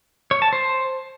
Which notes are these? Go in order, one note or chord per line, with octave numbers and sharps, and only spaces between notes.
C#5
A5
C5